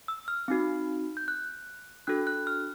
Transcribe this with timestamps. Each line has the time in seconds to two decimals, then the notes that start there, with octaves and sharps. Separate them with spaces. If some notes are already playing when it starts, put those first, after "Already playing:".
0.08 E6
0.28 F6
0.48 C4 D#4 F#4
1.17 G6
1.28 F#6
2.07 D4 F#4 A4 F#6
2.27 F#6
2.47 F6